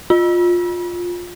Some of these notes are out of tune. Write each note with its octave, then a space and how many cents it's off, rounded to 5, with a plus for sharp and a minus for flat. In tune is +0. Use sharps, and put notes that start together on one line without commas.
F4 +15